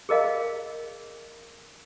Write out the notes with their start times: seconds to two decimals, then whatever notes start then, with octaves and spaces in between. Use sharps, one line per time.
0.09 G#4 A#4 D#5 F5